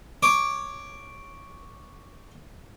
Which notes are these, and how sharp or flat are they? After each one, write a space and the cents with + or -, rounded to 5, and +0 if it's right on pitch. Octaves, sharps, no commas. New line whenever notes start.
C#5 +0 D6 +0